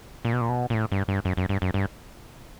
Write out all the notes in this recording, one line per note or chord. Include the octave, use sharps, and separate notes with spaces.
A#2
B2
A#2
B2
A#2
A2
G2
G2
F#2
F#2
G2
F#2
G2